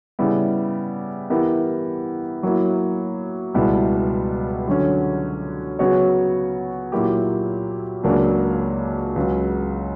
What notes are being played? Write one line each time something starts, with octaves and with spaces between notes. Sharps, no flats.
C#3 G3 B3 E4
E3 B3 E4 G4 A#4
F#3 A#3 E4
C#2 B2 G3 B3 E4
D3 F#3 C#4
C#3 F#3 B3 F#4 C#5
A#2 F#3 A#3 E4 G4
C#2 C#3 F#3 A#3 D4
C#2 C#3 F#3